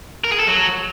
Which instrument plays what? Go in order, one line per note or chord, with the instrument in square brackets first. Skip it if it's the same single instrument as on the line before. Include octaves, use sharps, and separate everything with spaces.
[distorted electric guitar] A#4
G#4
A4
F#3